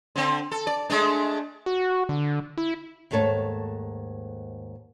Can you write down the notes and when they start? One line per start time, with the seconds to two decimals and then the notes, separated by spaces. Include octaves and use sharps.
0.16 D3 C4
0.51 A4
0.67 D5
0.90 G#3 A3 D4
1.66 F#4
2.09 D3
2.58 E4
3.11 D#2 G#2 A3 A4 C#5 A5